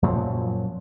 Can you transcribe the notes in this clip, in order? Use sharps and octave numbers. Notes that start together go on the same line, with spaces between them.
F#2 A#2 F3 F#3